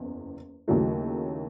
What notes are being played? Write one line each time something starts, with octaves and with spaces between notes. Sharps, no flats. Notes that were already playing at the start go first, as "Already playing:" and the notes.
Already playing: F#1 E2
D#2 C#3 F#3 A3 E4